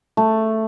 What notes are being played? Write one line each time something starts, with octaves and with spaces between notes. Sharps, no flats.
A3